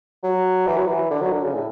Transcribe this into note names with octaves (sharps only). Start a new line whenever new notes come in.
F#3
E3
F#3
E3
D3
F#3
D3
C#3
A2